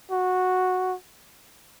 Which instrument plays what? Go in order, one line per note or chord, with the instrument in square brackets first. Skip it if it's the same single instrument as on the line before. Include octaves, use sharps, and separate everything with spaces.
[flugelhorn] F#4